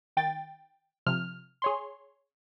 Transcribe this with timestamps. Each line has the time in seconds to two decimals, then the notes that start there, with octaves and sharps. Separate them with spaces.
0.17 D#3 G5 A6
1.06 C3 F3 F6
1.62 G#4 C#5 C6